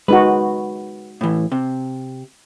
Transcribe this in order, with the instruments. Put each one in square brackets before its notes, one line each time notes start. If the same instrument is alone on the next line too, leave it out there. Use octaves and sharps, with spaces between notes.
[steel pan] G#3 D#4 F#4 [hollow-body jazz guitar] B4
[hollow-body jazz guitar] A2 E3
C3